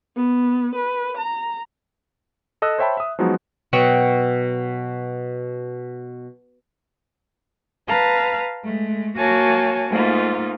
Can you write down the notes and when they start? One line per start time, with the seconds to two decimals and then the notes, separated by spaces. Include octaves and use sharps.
0.16 B3
0.75 B4
1.17 A#5
2.62 A4 D#5 D#6 E6 F#6
2.78 C5 C#5 E5 G5 A5 B5
2.97 E5 D#6
3.19 F3 F#3 G#3 B3 D#4 F#4
3.73 B2 F#3 G5 C#6
7.88 B4 F5 A5 A#5
8.64 G#3 A3
9.18 A#3 F#4 C#5 G#5 A5
9.91 G#2 A3 A#3 D#4 F4